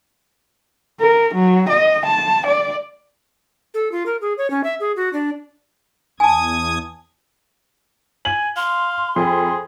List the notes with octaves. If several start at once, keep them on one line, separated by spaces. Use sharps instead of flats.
A#4
F#3
D#5
A5
D5
A4
F4
A#4
G#4
C#5
C#4
E5
G#4
F#4
D4
E2 G#5 A5 D#6 G#6
G#5 F#7
F5 C6
F2 G#4